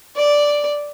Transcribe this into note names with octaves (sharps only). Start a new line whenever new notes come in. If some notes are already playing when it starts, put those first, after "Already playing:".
D5